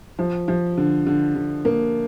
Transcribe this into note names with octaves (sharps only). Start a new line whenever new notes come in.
F3
F3
D3
D3
D3
A#3